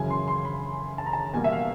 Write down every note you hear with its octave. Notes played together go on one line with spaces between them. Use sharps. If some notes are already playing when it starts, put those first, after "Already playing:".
Already playing: F#2 C#3 E3 G#5
C6
C6
B5
A5
A#5
A5
E2 B2 G3 A#3 G#5
E5
F5